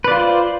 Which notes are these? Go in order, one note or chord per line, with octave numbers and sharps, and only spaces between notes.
F4 B4 C5 D5